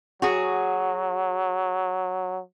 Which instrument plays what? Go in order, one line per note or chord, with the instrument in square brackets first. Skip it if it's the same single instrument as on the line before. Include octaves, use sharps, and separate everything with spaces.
[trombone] F#3 [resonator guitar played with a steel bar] F#4 G#4